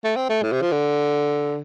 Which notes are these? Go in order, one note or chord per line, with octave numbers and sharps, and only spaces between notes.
A3
C4
A3
A2
C3
F3
D3